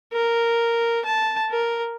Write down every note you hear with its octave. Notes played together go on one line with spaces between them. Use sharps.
A#4
A5
A#4